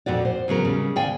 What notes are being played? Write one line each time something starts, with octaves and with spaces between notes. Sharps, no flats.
F2 A#2 F#4 D5
C5
E2 C#3 F#3 A#4
C#3 G3
D#2 D5 F5 G5 G#5